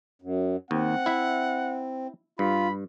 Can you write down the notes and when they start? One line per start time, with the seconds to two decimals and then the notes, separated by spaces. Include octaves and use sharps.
0.22 F#2
0.71 D#2 C4 F#5
1.06 E4 E5
2.39 G2 F4 B5